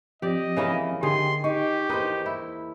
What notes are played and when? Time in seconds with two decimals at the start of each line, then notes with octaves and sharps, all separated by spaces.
0.22 F3 C4 G4 D5 D#5
0.56 C#3 E3 A#3 C#5 E5 F5
1.03 D3 D#3 G4 G#4 C6
1.44 D#4 G4 C#6
1.89 E2 A#3 D#4 B4 C5 D#5
2.26 E4